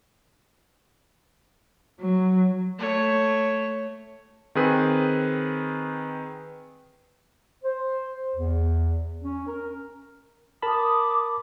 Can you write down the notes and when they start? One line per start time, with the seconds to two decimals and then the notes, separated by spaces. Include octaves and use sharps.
2.00 F#3
2.79 A3 C#5
4.55 D#3 C4 G#4 B4
7.64 C5
8.36 E2
9.22 C#4
9.47 A#4
10.62 A#4 A5 B5 D6 D#6